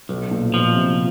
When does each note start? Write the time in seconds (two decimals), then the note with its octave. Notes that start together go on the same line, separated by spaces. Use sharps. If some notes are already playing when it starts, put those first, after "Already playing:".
0.09 B1 B2
0.31 A#2
0.54 B2 F3
0.75 C3